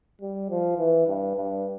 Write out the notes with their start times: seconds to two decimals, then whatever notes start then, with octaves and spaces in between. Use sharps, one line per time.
0.21 G3
0.50 F3
0.78 E3
1.07 G2
1.35 G2